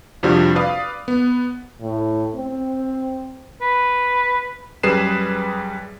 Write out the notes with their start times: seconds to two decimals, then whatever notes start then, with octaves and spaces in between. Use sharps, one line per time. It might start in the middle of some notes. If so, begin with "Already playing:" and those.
0.23 F2 C3 F3 G3 D4 F#4
0.56 B4 D5 F5 D#6
1.08 B3
1.81 A2
2.35 C4
3.62 B4
4.83 F#2 G3 G#4 B4 C7 E7